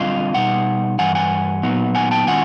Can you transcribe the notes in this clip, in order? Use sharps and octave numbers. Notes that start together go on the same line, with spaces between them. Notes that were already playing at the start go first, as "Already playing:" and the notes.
Already playing: D3 G3 C4 F4 D#5 F5
B2 G3 D#4 F#5
G2 E3 F#5 G#5
F#5 G#5
A#2 F#3 B3 D#4
F#5 G#5
G5 A5
D#3 G#3 C#4 F4 F#5 G#5